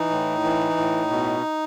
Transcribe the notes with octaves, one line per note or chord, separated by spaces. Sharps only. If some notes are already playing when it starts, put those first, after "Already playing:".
Already playing: E3 D#4
A2
E3
A2
B2